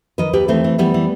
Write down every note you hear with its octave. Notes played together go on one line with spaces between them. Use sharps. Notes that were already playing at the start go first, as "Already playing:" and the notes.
D#3 B4 D#5
D#2 G4 B4
E3 A3 C4
E3
E3 G3 B3
E3